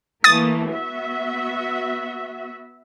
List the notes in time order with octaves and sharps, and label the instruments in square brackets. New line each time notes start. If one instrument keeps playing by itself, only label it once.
[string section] E3 A3 A#3 [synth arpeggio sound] D#6 A6
[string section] B3 F#4 E5